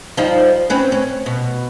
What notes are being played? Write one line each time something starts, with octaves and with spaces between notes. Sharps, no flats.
F3 G3 D#4
C4 C#4 B4
C#4
B2